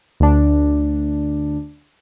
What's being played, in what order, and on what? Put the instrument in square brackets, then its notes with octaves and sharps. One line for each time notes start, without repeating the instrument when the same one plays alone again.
[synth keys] D2 D4